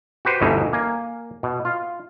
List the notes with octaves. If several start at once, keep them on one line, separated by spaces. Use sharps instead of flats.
F#4 G4 B4 C5
G1 D2 B2 E3 C#4 D#4
A#3 G#5
B2
F4